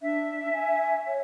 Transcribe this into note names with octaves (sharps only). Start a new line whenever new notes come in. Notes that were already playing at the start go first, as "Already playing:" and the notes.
D4 E5
G#5
C#5